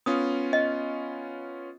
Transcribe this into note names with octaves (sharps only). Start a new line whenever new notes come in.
B3 C#4 F4 D#6
D#5